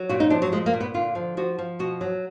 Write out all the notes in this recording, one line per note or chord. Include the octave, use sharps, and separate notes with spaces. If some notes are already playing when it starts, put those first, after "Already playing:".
Already playing: F#3
A#2 F#4
D#4
F3 D4
F#3
A#2 G#3
A#3
A#2
B3
D3 F4
F3
F3 F#4
F3
B2 F#4
F#3